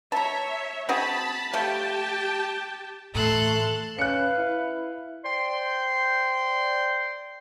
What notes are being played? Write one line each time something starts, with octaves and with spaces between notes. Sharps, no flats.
C#5 E5 A5 A#5
C4 F#4 G#4 A5 B5
F3 A3 G4 G5 A5
A2 E3 A3 A4 C6 F#6
C#4 B4 F5 F#6 C#7
E4
C5 D5 G5 C6